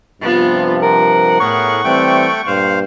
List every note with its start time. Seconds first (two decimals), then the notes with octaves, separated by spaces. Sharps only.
0.21 G2 C3 F3 B3 F4
0.82 A#4 F#5
1.40 A2 B3 G#4 A#4 C#6
1.84 E3 G3 A3 C4 G5
2.47 G2 A#2 C5 F5